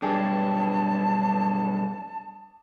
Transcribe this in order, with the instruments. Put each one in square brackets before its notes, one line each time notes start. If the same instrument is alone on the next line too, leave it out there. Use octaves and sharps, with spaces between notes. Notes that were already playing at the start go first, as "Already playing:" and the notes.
[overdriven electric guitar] B1 G2 [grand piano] D4 G4 G#4 [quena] A5